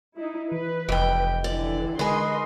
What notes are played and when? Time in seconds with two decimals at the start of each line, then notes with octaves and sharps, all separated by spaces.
0.16 D#4 E4
0.52 E3 B4
0.89 F1 E3 D#5 G5
1.44 D3 E3 D5
1.99 D3 G#3 D#4 A#4 B4 D#5 G#5 C6